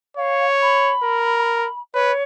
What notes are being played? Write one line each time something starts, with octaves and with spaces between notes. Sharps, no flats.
C#5 F5
B5
A#4
B4 C#5